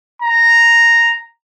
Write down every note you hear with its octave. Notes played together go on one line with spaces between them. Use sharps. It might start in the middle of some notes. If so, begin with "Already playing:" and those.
A#5